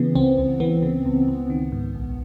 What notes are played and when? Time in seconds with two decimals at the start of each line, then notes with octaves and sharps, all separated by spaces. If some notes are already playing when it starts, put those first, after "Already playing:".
Already playing: C#3 E3 B3
0.15 C#2 C4
0.38 C#2
0.60 E3 B3
0.82 C#3
1.05 C#2
1.28 C#2
1.50 D#3
1.72 G#2
1.95 A#1